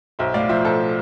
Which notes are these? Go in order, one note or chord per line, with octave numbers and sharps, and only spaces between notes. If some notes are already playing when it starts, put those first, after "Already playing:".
B1 C5 E5
A2 D5 F5
F3 C5 E5
B1 A4 C5